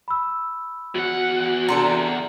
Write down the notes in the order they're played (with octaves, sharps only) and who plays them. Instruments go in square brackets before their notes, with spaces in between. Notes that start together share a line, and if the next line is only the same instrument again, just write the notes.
[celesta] B5 E6
[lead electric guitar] E2 F#5 [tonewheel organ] F#4
[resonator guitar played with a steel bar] C3 D4 A4 [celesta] A#5 C6